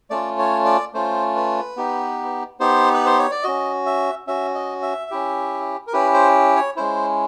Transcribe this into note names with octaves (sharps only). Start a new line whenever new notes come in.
A3 C#4 F4 D5
C#5
D5
A3 C#4 F4 C5
B4
B3 D#4 G4
B3 D#4 G4 C5
B4
C5
C#5
D5
C#4 F#4 D#5
E5
C#4 F#4 E5
D#5
E5
C#4 E4 G4
A#4
C#4 E4 G4 B4
C5
C#5
G#3 C#4 E4 C5